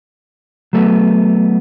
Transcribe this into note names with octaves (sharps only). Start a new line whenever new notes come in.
F#3 A3 B3